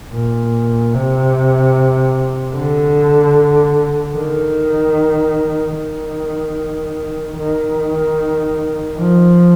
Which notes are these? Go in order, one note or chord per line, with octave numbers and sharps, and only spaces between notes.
A#2
C3
D3
D#3
D#3
D#3
F3